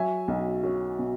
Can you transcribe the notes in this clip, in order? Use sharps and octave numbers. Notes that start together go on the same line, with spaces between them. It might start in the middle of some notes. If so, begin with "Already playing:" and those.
Already playing: F#3 E5 G#5
B1
F#3
B2